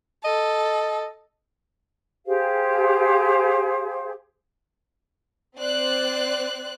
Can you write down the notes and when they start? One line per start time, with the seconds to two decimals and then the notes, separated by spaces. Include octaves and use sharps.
0.24 A4 D#5
2.26 G4 G#4 C5 F5
5.57 C4 C5 D5 F#6